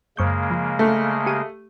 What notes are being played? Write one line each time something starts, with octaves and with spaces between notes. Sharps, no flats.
F#2 C#3 G#3 A#3 C#6 G6
F3
A3
G4 D#7